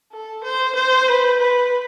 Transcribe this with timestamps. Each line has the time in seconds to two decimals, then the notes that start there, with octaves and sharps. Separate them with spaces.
0.13 A4
0.44 C5
0.76 C5
1.08 B4
1.39 B4